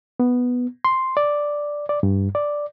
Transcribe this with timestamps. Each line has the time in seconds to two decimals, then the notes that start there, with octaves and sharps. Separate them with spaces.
0.20 B3
0.85 C6
1.17 D5
1.89 D5
2.03 G2
2.35 D5